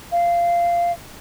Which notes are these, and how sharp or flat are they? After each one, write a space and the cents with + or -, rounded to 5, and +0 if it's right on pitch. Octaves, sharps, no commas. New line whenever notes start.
F5 -15